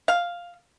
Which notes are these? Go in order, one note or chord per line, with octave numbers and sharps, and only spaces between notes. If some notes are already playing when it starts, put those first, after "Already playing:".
F5